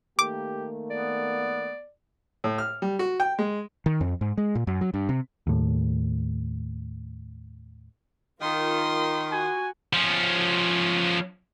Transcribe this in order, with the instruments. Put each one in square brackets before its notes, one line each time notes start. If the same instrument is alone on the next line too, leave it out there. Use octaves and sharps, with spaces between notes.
[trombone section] D#3 A3 A#3 [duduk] G4 [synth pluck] D6
[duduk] B3 [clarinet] D5
[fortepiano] A2
F6
G3
F#4
G5
G#3
[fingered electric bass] D#3
F2
G#2
G#3
A#2
F#2
F#3
G2
C3
[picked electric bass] D#2 A2
[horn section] D#3 [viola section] F4 A#4 [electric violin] C6 D#6
[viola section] F#4 [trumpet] G#5
[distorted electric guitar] F3 C#4